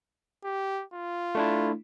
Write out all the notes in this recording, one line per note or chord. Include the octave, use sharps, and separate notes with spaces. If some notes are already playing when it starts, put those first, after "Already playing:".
G4
F4
A3 D4 E4